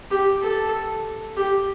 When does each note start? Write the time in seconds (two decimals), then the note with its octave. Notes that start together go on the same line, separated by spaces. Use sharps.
0.11 G4
0.42 A4
1.37 G4